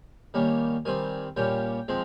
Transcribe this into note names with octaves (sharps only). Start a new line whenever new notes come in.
D#3 G3 A#3 C#4
D#3 G3 C4 G#5
A#2 G3 C#4 G5
F3 G#3 C4